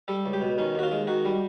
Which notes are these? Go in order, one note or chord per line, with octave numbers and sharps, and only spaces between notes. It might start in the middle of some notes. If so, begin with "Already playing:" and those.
G3 A4
C#2
G4
B2
D#3 C#4
D#2 F#4
F4
G#3
D#3 F#4
G3